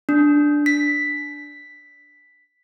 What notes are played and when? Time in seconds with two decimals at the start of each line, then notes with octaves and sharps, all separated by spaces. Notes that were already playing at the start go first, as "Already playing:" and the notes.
0.09 D4
0.66 B6